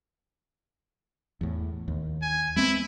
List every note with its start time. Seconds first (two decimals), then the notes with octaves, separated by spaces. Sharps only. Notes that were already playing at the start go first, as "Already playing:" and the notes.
1.41 E2 A2
1.88 D#2
2.22 G#5
2.56 G#3 B3 C4 E4